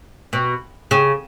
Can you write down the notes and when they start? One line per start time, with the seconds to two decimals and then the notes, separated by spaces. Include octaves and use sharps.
0.33 B2
0.91 C#3